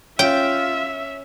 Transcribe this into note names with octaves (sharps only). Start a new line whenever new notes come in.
C#4 F4 E5 G5